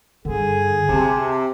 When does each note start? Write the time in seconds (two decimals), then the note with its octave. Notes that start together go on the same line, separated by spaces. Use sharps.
0.25 G2 D3 G#4
0.89 C3 C4 A5